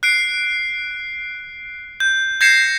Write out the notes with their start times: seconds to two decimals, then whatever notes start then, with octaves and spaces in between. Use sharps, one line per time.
0.03 F#6 C7 D7
2.00 G6
2.41 G6 G#6 A#6 C7 C#7 E7